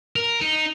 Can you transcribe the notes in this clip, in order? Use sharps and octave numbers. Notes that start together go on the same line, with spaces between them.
A#4
D#4